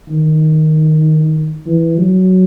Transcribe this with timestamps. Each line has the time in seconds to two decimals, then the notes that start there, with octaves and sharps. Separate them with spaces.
0.09 D#3
1.66 E3
1.98 F#3